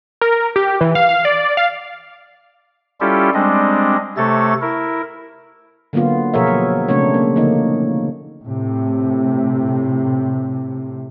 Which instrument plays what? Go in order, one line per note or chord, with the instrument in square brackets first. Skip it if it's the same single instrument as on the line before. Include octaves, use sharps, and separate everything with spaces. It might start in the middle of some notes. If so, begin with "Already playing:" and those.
[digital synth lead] A#4
G4
E3
F5
F5
D5
F5
[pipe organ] G3 C#4 E4 F4 G4 A4
G3 G#3 C4 D4 D#5
C3 A3 A4 C#5 A6
E4 A#4
[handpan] D3 F#3 A#3 B3 F4
B2 F3 G#4 A#4 C#5 E5
F#3
C#3 A3 C4 D4 C#5
A#3
D3 F3 A#3 D#4
[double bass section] A2 C3